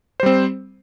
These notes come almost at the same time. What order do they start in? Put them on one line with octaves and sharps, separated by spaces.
C5 G3 C4